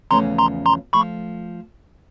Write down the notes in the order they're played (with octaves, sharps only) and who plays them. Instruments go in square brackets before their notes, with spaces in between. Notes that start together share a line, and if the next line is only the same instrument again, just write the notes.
[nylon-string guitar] E2 C#3 F3 A3 C#4 [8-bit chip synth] A#5 C6
[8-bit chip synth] A#5 C6
A#5 C6
[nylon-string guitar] F3 A3 [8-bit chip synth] B5 C#6